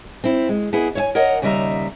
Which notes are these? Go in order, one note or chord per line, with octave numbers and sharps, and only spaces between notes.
C4 E4
G#3
B3 E4 G#4
C#5 E5 G#5
A#4 C#5 D#5 F#5
D#2 C#3 G3 D#5 E5 A#5